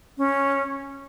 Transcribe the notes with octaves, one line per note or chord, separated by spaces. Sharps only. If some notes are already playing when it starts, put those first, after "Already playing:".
C#4